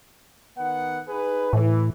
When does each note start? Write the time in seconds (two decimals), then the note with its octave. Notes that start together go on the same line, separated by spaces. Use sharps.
0.58 D#3 B3 F#5
1.09 D#4 G#4 B4
1.53 A2 E3